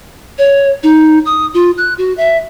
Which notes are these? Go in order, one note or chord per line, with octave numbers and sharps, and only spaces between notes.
C#5
D#4
D#6
F4
F#6
F#4
E5